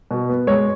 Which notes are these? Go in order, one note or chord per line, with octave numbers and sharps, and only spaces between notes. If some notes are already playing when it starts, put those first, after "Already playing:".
B2
B3
G#3 C#5